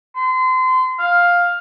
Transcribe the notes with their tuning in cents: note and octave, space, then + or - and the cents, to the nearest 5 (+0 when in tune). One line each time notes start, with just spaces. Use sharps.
C6 -30
F5 +10